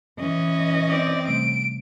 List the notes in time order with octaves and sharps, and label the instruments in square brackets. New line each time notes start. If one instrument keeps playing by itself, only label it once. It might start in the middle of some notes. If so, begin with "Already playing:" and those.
[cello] E3 D#5 [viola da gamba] C#4
[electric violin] C4 D5
[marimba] C3 G3 A3 [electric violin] D7